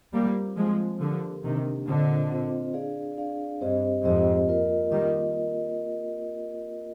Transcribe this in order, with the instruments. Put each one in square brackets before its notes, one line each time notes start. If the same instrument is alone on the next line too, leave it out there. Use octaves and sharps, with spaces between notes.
[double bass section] G3 A#3 [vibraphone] C4 F4 C5
[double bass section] F3 G#3 [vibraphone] C4 F4 C5
[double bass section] D3 F3 [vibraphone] A#3 D4 G4 A#4
[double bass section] C3 D#3 [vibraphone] A#3 D4 G4 A#4
[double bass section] A#2 D3 [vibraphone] C4 F4 C5 D#5
[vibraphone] C4 F4 C5 D#5
D4 G#4 D5 F5
D4 G#4 D5 F5
[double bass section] G2 [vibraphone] C4 G4 C5 D#5
[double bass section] F2 G#2 [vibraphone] C4 G4 C5 D#5
[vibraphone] A#3 F4 A#4 D#5
[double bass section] D#3 G3 [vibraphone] A#3 F4 A#4 D#5